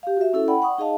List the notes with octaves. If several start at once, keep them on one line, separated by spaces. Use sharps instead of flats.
G4 F5
F#4 E5
C#4 E4 A4
D5 F#5 G5 B5
F#5 C#6 D#6
D#4 G#4 D#5 F5 A5